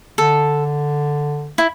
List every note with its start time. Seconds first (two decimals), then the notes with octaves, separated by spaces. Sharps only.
0.18 D3 A4
1.58 E4